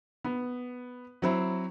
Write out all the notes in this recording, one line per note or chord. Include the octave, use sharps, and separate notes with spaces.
B3
F#3 C4 E4